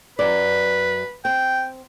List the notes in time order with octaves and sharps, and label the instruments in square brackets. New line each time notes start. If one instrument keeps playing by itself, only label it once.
[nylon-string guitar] F#2 D5 [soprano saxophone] B4
[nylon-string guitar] C4 [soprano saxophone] G5